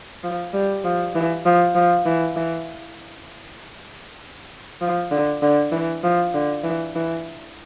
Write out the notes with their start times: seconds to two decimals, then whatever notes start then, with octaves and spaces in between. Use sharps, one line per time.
0.24 F3
0.54 G3
0.85 F3
1.15 E3
1.46 F3
1.75 F3
2.06 E3
2.36 E3
4.82 F3
5.11 D3
5.42 D3
5.72 E3
6.04 F3
6.34 D3
6.64 E3
6.95 E3